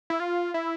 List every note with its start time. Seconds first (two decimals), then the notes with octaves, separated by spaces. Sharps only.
0.10 E4
0.20 F4
0.54 E4